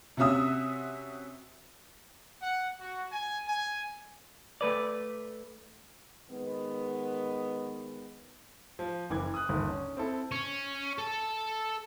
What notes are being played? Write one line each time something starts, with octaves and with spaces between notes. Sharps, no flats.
C3 C#4 F#4 E5 D#6 E6
F#5
F#4
G#5
G#5
A3 B4 D5
D#3 G#3 B3
F3
F#1 E3 D6 G#6
D#6 F#6
G1 D#2
C#4
C4 E4 A4
C#4
A4 A5